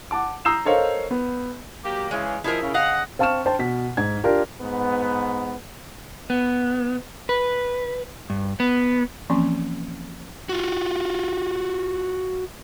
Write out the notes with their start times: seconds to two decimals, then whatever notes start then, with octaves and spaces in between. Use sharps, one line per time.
0.11 F#5 A5 D6
0.45 A#5 D#6 E6 G6 C7 E7
0.65 A4 A#4 C5 C#5 D#5 F5
1.11 B3
1.84 F#3 A#3 G4
2.11 C#3 E3 G#3
2.44 F3 D#4 E4 G#4 A#4
2.61 C#3
2.75 C#3 D#5 F5 F#5
3.19 C4 F5 A5 C#6 F6 E7
3.46 C5 G5 A5
3.59 B2 B6
3.97 G#2 G#6
4.24 D4 F4 G4 A#4
4.61 G#2 B3
6.30 B3
7.29 B4
8.30 G2
8.60 B3
9.30 E3 F3 A#3 C4 C#4
10.49 F4 F#4